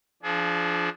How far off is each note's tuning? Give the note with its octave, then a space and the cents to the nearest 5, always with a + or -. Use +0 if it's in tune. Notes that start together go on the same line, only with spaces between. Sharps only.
F3 -10 D4 +0 G#4 +35